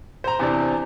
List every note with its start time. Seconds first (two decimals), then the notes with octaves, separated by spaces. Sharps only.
0.24 C5 A#5
0.39 E2 C3 D4